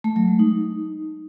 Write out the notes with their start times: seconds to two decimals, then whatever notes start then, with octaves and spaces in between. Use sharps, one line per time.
0.04 A3
0.16 F#3
0.28 G#3
0.39 D#4